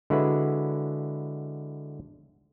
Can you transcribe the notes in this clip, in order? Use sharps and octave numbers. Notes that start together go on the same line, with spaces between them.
D3 G#3 E4 F#4 B4